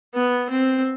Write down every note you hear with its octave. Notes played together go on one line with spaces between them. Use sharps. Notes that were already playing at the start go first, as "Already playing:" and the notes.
B3
C4